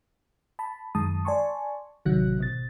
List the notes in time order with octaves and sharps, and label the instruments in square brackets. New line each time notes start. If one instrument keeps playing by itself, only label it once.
[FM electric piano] A5 B5
F#2 D#3 G#3 A5 D#6
D5 G#5 A5 C6 C#6
A1 C3 D#3 F#3 F#4 F#6
G#1 B2 A6